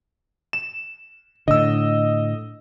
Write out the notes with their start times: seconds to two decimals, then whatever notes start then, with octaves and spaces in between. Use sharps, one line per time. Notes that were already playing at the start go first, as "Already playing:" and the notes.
0.53 E7
1.48 A2 D3 D#5 E6